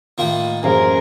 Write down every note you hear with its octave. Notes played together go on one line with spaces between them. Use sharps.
A2 D#3 A#3 F4
A1 F#2 A#3 G#4 A#4 C5